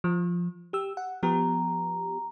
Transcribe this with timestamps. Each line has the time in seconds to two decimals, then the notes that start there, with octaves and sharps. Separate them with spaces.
0.04 F3
0.73 G4 E6
0.97 F#5
1.23 F3 B3 G4 A#5